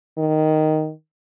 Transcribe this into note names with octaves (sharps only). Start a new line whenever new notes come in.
D#3